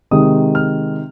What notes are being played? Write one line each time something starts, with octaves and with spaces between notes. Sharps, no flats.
C3 D#3 G#3 D#6
F6